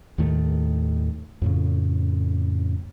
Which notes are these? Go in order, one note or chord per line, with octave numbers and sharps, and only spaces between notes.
D#2 A2 D#3 A3
F2 A2 C#3